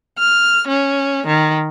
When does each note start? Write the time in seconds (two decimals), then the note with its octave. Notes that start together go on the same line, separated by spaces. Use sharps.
0.19 F6
0.68 C#4
1.27 D#3